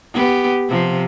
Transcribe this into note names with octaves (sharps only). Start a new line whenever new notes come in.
B3 G4
C3 F3